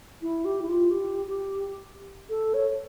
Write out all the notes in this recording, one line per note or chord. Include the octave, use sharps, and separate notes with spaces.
E4
G4
E4
F4
G4
G4
A4
C#5